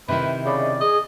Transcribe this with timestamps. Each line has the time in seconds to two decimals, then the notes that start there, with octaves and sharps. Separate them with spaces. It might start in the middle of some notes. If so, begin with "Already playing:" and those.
0.08 C3 D#3 E4 B4
0.45 C#3 D5 B5
0.59 D#5
0.81 G#4 D#5